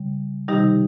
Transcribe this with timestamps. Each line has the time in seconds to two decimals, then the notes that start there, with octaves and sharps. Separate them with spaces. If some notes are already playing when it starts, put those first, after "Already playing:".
Already playing: C#3 G3
0.49 C3 D#3 G3 D#4 G4